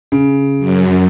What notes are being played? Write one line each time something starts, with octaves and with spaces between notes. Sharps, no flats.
C#3
F#2